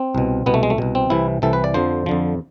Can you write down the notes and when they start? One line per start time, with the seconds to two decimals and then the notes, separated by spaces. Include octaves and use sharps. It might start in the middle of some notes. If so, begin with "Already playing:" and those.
Already playing: C4
0.15 C2 B2
0.46 C2 B2 B3
0.54 A3
0.63 G#3
0.70 A3
0.78 C2 B2
0.95 C4
1.10 C2 C3 E3 E4
1.42 C2 C3 E3 A4
1.53 B4
1.64 D5
1.74 F2 D3 F3 C5
2.06 F2 D3 F3